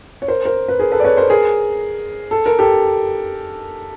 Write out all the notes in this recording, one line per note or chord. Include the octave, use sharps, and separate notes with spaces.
C#5
A#4 C5
A#4 C5
B4
G#4 A#4
A4 B4
D5
B4 C#5
A#4 C5
G#4 A#4
A4
A#4
G4 A4